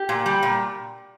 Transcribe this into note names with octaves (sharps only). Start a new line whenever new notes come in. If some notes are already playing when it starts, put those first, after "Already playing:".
Already playing: G4
A#2
G3
A#2